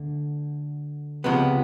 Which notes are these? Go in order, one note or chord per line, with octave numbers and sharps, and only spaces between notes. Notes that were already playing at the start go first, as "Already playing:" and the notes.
Already playing: D2 D3
C#2 C3 F3 G#3 B3